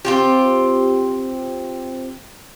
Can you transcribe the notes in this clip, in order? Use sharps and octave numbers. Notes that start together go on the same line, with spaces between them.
C4 F4 G4